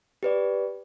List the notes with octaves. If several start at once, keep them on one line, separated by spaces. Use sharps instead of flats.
G4 B4 D5